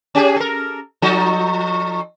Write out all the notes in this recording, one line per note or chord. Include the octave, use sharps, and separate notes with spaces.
C#4 G4 G#4
A4 A#4
F3 D#4 A4